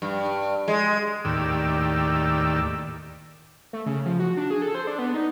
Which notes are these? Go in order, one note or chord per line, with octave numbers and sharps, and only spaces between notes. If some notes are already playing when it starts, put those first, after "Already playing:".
G2
G#3
D#2 A2 D#3 G4 D5 E6
A3
C#3
F3
F#4
D4
G#4
A4
C5
D4
B3
D#4